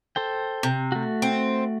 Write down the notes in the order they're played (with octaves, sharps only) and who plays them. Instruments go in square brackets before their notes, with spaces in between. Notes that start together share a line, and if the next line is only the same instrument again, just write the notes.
[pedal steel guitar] A4 C5 G5
[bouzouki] C3
[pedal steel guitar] A3 F#4
[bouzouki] C4